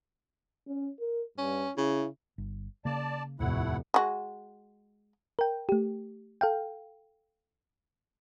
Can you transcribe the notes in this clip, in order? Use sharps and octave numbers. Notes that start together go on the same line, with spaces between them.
C#4
A#4
G2 C#4
C#3 E4
G1
C#3 A#3 D5 A5
F1 D#2 A2 A3 E4 F#5
G#3 F#4
A#4 G5
A3 G4
A4 F5 G5